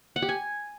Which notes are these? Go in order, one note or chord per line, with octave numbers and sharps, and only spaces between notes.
F#5
G4
G#5